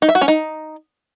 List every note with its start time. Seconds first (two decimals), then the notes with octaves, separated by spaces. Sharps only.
0.02 D#4
0.09 E5
0.15 F#4
0.21 C#4
0.28 D#4